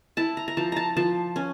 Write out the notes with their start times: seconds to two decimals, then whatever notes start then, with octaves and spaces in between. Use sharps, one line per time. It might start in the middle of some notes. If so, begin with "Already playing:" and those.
0.17 E4 A5
0.37 A#5
0.48 A#5
0.57 F3 A5
0.72 A5 A#5
0.97 F3 A5
1.36 C#4